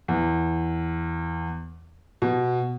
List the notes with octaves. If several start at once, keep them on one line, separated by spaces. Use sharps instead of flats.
E2
B2